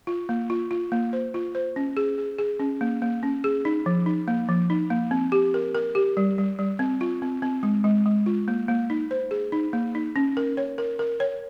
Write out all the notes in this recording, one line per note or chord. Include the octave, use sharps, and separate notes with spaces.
F4
A#3
F4
F4
A#3
C5
F4
C5
C#4
G#4
G#4
G#4
C#4
A#3
A#3
C#4
G#4
D#4
F3
D#4
A#3
F3
D#4
A#3
C4
G4
A#4
A#4
G4
G3
G3
G3
C4
F4
C4
C4
G#3
G#3
G#3
F4
A#3
A#3
D#4
C5
G#4
D#4
A#3
D#4
C#4
A#4
C#5
A#4
A#4
C#5